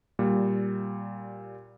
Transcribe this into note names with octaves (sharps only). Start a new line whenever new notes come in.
A#2 G3